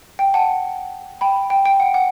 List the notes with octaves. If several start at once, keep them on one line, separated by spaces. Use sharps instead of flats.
G5
F#5 A5
G5 B5
G5
G5
F#5
F#5